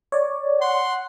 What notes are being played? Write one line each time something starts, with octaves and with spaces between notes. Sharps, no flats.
C#5 D5
F#5 C6